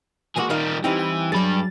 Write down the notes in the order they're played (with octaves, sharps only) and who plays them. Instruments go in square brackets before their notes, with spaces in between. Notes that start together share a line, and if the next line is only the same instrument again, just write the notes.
[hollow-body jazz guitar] E3 G#3 A#3 [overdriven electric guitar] F#4 G#4
[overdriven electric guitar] D#3 G3 [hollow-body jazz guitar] D#4 A#4 F5
[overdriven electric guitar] E3 [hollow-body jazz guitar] G3 C4 D#4 [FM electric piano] G5
[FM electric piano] G5
[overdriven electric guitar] G2 B5 [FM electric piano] F#3 A6 [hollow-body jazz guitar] G#4 D5